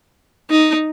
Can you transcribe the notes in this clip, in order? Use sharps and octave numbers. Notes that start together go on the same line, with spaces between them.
D#4